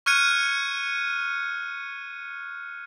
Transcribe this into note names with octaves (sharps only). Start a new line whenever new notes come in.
C#6 F6 F#6 G#6 C#7 D#7